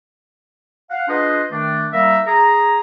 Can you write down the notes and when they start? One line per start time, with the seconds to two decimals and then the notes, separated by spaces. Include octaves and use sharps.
0.90 F5 F#5
1.07 D4 F4 G#4 B4 C5 D#5
1.50 D#3 A3 D4
1.91 G3 A#3 D#4 A#4 E5
2.26 G#4 A#5